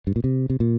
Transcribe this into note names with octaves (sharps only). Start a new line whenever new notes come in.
G2
A#2
C3
C3
A#2